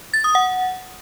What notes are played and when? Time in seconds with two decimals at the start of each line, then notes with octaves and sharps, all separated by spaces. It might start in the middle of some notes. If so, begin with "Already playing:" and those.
0.14 A6
0.24 D#6
0.35 F#5